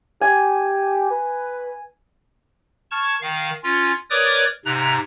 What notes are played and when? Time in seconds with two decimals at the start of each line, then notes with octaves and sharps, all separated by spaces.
0.21 G4 G#5
1.10 B4
2.91 A5 C#6 F6 G#6
3.22 D#3 F5
3.64 C#4 F4
4.10 A#4 B4 C#5 D5 D6 D#6
4.65 G#2 C3 A#5 F#6